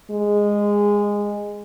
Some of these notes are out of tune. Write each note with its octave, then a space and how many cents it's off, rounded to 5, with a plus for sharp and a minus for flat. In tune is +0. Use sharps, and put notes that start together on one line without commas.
G#3 -15